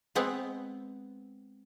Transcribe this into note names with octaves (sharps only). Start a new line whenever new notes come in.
G#3 B3 C4 F#5